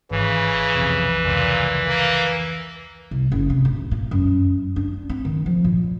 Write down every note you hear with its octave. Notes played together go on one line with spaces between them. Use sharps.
G#1 C#3 E3
B1 F2 C3
F1 C#2 A#2
A#3
C2
F#1
C3
D1
A#2
F#2
D4
C4
D#3
F3
A#2